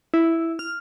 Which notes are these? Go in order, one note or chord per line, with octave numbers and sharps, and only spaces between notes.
E4
F6